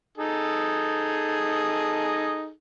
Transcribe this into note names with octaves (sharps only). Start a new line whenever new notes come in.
D#4 G#4 A4